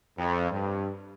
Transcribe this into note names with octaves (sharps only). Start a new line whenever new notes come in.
F2
G2